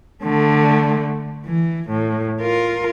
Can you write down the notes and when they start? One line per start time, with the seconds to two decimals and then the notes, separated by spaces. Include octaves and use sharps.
0.23 D3 A3
1.46 E3
1.89 A2
2.41 F4 A#4